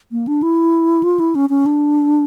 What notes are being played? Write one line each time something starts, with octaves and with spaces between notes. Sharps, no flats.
A#3
D4
E4
F4
E4
C#4
C#4
D4